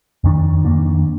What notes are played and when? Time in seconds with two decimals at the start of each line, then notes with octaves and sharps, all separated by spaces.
0.24 F2 D#3 A#3 D4
0.65 F2 D#3 A#3 D4